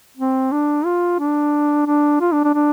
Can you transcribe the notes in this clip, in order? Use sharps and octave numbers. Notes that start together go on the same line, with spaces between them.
C4
D4
F4
D4
D4
F4
D4
D4
D4